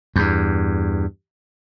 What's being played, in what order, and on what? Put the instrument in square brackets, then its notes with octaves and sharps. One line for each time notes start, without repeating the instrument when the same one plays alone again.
[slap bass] E2 G2